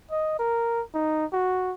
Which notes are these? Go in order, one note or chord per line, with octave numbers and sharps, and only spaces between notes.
D#5
A#4
D#4
F#4